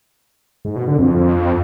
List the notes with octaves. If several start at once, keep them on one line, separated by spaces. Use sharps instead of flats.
G#2
B2
D3
F2